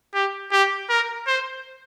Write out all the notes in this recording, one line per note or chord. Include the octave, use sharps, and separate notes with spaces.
G4
G4
A#4
C5